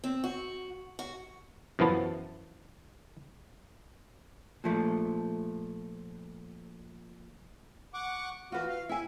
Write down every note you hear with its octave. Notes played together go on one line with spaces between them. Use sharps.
C4
F#4
F#4
F#2 E3 F3 B3 A5
A#2 F3 A3
F#5 C#6 D6
E3 F4 F#4 B4
F5
E4 E5 G#5